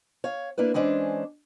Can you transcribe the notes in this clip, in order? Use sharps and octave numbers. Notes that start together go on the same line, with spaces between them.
C#5 F5
A#3 D4 E4 B4
E3 G#3 C#4 D4 C5